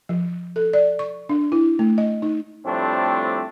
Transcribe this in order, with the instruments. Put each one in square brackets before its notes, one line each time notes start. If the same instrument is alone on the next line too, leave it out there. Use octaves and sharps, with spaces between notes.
[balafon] F3
A4
D5
C#6
D4
E4
A3
D#5
D#4
[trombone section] A2 F3 G3 A3 C4 D4